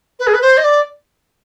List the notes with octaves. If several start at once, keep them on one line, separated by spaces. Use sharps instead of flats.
B4
G#4
B4
C5
D#5
D5